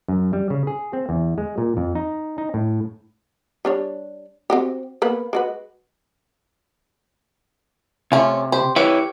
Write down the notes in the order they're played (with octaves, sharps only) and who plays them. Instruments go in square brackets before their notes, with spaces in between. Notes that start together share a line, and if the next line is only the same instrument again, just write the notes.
[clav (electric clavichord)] F#2
G3
C#3
G#4
C4
E2
G#3
A#2
F2
D#4
D#4
A2
[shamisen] G3 D4 C#5
C4 F#4 G4
A#3 B3 B4
G#3 F#4 B4
[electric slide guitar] C3 [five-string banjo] A3 C#4 F4
[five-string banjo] G4 C5
[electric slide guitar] E4 B4 C#5 [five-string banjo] G4